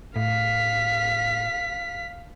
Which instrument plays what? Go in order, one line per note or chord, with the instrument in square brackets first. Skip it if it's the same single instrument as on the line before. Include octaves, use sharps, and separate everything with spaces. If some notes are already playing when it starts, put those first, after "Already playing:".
[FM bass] A2 [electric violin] F5 B6